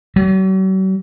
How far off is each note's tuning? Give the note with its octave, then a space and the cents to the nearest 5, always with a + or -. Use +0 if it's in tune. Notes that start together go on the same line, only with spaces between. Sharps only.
F#3 +45